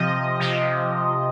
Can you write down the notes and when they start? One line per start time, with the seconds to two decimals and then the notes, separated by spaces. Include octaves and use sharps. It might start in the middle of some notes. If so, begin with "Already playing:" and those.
Already playing: C3 F3 D#5
0.40 C3 F3